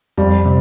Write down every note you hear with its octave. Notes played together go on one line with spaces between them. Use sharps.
F2 G3
C3